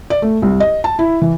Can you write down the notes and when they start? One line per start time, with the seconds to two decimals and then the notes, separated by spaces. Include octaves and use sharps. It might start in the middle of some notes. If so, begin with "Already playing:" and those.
0.10 D5
0.22 A3
0.42 C2
0.60 D#5
0.84 A5
0.99 E4
1.22 E3